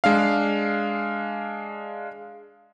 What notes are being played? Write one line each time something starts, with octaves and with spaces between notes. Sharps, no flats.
G#3 D4 F5